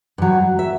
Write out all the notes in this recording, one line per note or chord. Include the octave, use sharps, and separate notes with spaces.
G2 F#3
E5